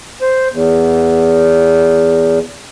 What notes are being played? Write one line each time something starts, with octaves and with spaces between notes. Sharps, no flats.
C5
E2